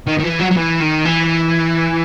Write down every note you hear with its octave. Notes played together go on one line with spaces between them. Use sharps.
D#3
D#3
E3
F#3
F#3
E3
D#3
E3